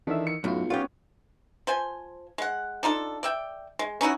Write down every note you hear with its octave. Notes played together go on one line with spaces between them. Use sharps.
D#3 E3 D4 A4 E5 E6
C#7
B1 F#2 A2 E4 F4
B3 C#4 F4 G4 C#5
F3 C5 G#5
G#3 F#5
D4 D#4 F4 A4
D5 E5 G5
G#3
C#4 D#4 E4 F#4